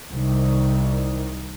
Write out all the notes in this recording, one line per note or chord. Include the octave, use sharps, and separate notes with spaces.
C2 D#3